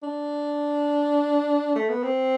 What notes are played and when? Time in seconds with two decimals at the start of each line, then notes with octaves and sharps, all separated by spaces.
0.03 D4
1.76 A3
1.90 B3
2.03 C4